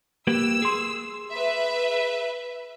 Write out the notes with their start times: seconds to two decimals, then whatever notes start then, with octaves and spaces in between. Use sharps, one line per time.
0.27 A#3 G4 B4 E6
0.62 G#4 C6
1.32 B4 E5